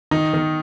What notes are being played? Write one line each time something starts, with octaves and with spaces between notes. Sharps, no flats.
D#3 D#4
D#3